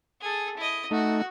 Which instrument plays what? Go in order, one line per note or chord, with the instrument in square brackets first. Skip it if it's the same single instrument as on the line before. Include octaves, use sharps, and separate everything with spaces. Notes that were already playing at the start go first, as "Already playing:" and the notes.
[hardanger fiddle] G#4 A4
E4 D#5
[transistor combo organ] A3 D#4 [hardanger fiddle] F#4